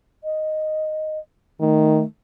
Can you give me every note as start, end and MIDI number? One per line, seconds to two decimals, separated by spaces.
0.24 1.19 75
1.60 2.01 51
1.60 2.04 57